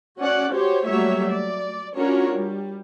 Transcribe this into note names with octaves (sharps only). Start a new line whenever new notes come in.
C#4 F#4 D5 F#5
F#4 G4 C5 C#5
F#3 G3 A3 A#3 C#5 E5
D5
C#4 D4 F4 F#4 A#4 C#5
G3